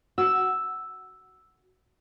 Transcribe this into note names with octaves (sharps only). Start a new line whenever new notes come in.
F#4 E6